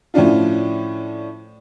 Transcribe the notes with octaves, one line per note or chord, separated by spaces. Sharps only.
A2 F3 C#4 D4 F4